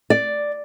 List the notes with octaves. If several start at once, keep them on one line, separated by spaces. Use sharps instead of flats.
D5